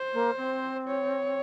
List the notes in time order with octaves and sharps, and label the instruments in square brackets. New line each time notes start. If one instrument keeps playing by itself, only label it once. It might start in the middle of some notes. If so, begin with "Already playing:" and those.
Already playing: [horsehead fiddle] C5
[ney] A#3
C4
[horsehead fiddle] C#5